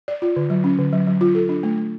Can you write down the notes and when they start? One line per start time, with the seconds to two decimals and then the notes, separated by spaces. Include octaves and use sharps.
0.08 D5
0.22 F4
0.36 D3
0.50 F#3
0.64 C#4
0.79 D3
0.92 F#3
1.07 F#3
1.21 F4
1.35 A4
1.49 D4
1.63 A3
1.78 A3